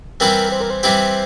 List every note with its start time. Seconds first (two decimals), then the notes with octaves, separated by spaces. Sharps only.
0.20 E3 G3 C4 E4 G4 A#4
0.52 C5
0.60 A#4
0.70 C5
0.83 E3 G3 C4 E4 G4